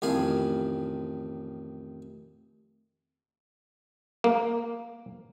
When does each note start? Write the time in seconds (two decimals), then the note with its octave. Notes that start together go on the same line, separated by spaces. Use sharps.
0.02 A1 F2 D#3 F5 G#5 B5
4.24 A#3